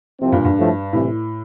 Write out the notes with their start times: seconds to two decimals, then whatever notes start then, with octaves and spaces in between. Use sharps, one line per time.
0.20 C2 C3 F3 C4
0.32 G2 A#2
0.45 G2
0.57 A2 F3 A3
0.93 C2 A2 C3 E3